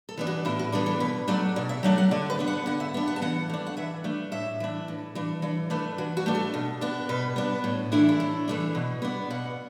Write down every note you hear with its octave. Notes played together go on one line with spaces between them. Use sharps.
A4
E3 B3 D4
F#4
A2 E4
F#4
E3 B3 D4 A4
A4
B2 B4
F#3 A3 D4 D5
B2 D5
E5
F#3 A3 D4 F#5
F#5
D3 D5
B4
B3 D4
F#5
D3 F#5
E5
B3 D4
F#5
A5
E3 F#5
A3 D4
F#5
E3 E5
A3 D4
A2 E5
E3 D4
A2
E3 D4
E3 D5
A3 D4 B4
E3 F#4
F#4
A3 D4
A4
B2
B3 D4
B2 B4
B3 D4
A2
E3 A3 D4 E4
E4
A2
E3 A3 D4
B2
B3 D4
B2 F#5